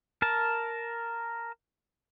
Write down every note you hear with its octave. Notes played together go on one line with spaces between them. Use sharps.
A#4 A5